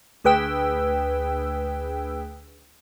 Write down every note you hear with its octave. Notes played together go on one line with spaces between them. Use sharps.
D2 G#4 B4 G5 E6